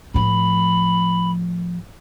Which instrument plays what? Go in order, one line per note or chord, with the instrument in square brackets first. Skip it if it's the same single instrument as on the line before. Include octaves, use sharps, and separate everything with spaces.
[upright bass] A2 F3 [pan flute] B5